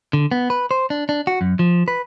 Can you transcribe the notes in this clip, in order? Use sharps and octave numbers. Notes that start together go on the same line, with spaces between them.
D3
B3
B4
C5
D4
D4
F#4
F#2
F3
B4